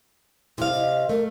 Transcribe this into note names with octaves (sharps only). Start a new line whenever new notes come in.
C3 E4 F5
D#5
A3 A#4